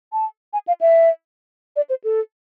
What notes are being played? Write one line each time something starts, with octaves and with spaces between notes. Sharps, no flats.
A5
G#5
F5
E5
D5
C5
A4